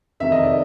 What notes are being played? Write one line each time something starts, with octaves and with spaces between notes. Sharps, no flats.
F2 C3 D#3 E5
D#5
D5